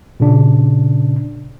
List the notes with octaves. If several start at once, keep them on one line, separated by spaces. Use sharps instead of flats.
A#2 C#3 D4